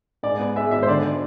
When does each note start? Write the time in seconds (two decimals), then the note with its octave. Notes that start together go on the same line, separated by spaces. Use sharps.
0.23 G#2 D5
0.39 B3
0.56 G#3 E5
0.71 G#1 E5
0.83 C5
0.88 D3 D5